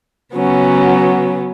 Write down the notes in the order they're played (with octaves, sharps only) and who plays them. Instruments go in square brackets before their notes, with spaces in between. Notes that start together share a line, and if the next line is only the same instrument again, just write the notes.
[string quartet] C#3 F#3 B3 C#4